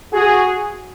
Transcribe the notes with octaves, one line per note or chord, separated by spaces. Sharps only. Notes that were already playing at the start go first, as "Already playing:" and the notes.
F#4 G#4